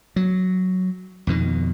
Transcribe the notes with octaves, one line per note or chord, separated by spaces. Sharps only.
F#3
F2 B2 D#3